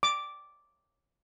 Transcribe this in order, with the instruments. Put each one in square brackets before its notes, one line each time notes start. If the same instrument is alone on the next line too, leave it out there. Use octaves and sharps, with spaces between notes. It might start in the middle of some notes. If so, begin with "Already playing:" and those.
[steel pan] D6